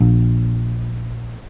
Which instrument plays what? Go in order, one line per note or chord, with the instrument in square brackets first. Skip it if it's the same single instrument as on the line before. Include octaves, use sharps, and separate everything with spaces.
[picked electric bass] A#1